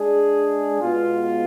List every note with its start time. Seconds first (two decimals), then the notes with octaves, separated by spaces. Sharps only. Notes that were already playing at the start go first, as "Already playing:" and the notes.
Already playing: G#3 D4 G#4
0.81 B2 G#3 B3 F4